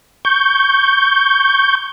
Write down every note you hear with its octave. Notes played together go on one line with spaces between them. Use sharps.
C#6 G6